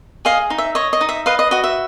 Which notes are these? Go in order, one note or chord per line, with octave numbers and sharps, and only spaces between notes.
G#4 D#5 F5
D#4
E5
C#5 D#5
D#5
D#4
E5
B4 D#5 F5
D#5
F#4 D#5
E5